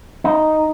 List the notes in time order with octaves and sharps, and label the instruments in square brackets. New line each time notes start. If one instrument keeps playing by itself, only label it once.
[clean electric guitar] D#4